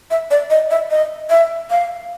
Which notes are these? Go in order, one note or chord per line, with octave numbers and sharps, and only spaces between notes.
E5
D5
D#5
E5
D#5
E5
F5